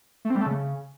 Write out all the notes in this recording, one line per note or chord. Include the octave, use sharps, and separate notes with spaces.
A3
C4
G3
A3
C#3